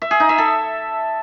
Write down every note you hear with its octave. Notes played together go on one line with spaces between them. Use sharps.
E5
G#4
D#4
E5
A4